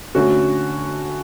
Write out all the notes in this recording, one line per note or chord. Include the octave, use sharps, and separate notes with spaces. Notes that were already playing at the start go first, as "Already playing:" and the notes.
D3 A3 C#4 F#4